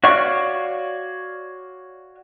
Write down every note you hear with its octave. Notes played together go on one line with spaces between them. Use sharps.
F#4 C#5 D5 F5 C#6